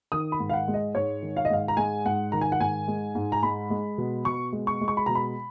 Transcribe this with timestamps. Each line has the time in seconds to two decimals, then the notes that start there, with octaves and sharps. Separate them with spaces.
0.12 D#3 D#6
0.32 B5
0.40 G#2
0.49 F5
0.53 F#5
0.68 G#3
0.74 D#5
0.95 G#2 C#5
1.22 D#3
1.37 F5
1.45 D#5
1.50 G#2 F5
1.68 A#5
1.77 G#3 G#5
2.05 G#2 F#5
2.32 D#3 A#5
2.41 G#5
2.52 F#5
2.60 G#2 G#5
2.88 G#3
3.15 G#2
3.32 A#5
3.43 G#3 B5
3.70 G#3
3.98 B2
4.25 B2 C#6
4.53 G#3
4.67 C#6
4.81 G#3
4.88 C#6
4.97 B5
5.06 B2 A#5
5.15 B5